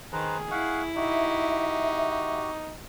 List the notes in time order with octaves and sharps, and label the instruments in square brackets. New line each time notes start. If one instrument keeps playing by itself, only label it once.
[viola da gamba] D#3 [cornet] G#4 [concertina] B4 C5 A#5
[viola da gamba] E4 [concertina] F5 F#5 C#6
[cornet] D#4 [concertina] F#4 G4 [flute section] E5